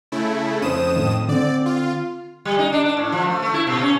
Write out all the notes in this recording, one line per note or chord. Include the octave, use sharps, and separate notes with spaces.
C#3 A3 E4
F2 C#4 C5 D#6 E7
A2 D#3
D3 C4 D5
F4
G3
D#4
D4
D4
A2
F3
A3
A3
E4
B2
C#4